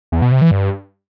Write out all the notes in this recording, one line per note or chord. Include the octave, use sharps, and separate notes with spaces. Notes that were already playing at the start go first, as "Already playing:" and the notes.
E2
B2
C3
E3
G2